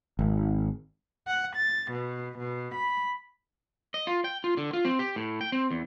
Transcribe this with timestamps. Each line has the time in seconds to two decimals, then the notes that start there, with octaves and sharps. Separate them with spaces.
0.19 G#1
1.27 F#5
1.56 A6
1.90 B2
2.37 B2
2.74 B5
3.94 D#5
4.07 F4
4.24 G5
4.44 F4
4.57 D3
4.73 F4
4.85 C4
4.99 G4
5.16 A2
5.41 G5
5.52 C4
5.71 E2